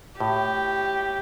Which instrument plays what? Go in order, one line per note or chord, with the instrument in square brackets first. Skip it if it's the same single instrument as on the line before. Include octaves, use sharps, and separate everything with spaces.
[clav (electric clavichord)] A2 [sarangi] G4